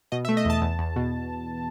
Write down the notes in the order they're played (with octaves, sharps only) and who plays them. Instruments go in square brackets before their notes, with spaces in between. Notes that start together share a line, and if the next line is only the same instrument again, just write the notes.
[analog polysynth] B2 D#5
E5
A3
D#5
E2 A5
E2
E2
B2